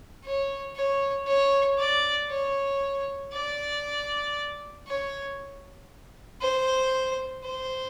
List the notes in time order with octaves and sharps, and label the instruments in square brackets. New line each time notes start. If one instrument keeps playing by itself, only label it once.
[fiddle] C#5
C#5
C#5
D5
C#5
D5
C#5
C5
C5